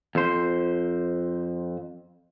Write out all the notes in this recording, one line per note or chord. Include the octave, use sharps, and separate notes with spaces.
F2 C5